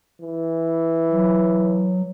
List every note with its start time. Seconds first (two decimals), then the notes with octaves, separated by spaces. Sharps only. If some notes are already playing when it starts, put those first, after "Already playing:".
0.20 E3
1.11 F#3